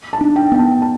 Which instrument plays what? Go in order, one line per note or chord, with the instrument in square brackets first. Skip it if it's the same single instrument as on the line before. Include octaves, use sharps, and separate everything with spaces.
[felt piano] A5
[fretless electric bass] D4
[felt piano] G5
[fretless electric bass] B3 [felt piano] G5
[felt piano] A5
A5